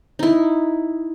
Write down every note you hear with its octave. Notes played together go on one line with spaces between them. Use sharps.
D#4 E4